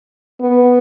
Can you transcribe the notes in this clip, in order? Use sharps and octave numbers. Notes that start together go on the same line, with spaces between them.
B3